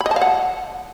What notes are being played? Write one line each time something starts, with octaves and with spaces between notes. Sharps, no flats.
B5
D#5
A5
F5
F#5